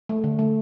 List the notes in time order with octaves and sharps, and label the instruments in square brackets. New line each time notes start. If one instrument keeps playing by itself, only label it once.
[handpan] A3
D3
A3